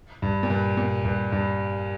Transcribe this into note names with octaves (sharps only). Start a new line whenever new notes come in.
G2
A#2
G2
A#2
G2
G2